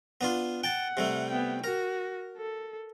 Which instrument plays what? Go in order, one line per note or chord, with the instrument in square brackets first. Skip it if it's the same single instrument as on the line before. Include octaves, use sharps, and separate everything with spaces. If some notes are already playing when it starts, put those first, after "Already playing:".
[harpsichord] B3 D4 F4
[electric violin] F#5 [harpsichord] G5 A5
[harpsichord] C3 G3 A3
[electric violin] B3 G5
[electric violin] F#4 [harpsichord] A#4
[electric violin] A4